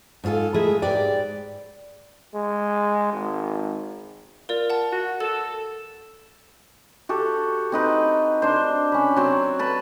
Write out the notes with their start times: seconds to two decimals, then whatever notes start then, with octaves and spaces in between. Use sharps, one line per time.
0.24 G#2 C4 F4 A4 G#5
0.54 G#3 A3 E4 G#4 A#4 E5
0.82 G#2 G4 B4 D5 G5
2.35 G#3
3.13 G#1
4.49 F4 A#4 D5
4.70 F#5 A5
4.92 F#4
5.20 A4 E7
7.09 F#4 G4 A4
7.72 C4 D#4 B4
8.42 D4 C5
8.92 C#4 B5
9.16 F#3 C4
9.59 B4 A5